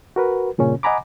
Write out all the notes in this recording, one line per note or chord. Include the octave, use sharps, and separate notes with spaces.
F#4 A#4 B4
G2 A#2 C#3 C#4
D#5 F#5 G#5 A#5 B5 D6